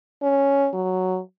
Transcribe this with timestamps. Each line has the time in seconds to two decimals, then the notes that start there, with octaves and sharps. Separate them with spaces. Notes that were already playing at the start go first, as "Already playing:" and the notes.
0.22 C#4
0.74 F#3